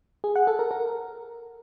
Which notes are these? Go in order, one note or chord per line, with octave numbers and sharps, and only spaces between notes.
G#4
F#5
A4
A#4
A#4